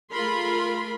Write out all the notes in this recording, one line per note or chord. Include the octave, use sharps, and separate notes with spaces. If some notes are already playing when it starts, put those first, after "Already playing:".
A3 F4 G#4 A#4 B5 C6